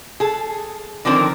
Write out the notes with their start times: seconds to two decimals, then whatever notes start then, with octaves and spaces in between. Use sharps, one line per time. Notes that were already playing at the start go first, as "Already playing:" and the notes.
0.20 G#4 A4
1.05 D3 D#3 F3 C4 A#4 C#5